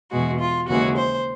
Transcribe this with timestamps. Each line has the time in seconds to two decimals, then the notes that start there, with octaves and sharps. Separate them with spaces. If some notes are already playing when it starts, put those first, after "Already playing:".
0.11 E2 B2 G#3 F#4
0.40 F4
0.68 D#2 C#3 E3 G#3 F#4
0.97 C5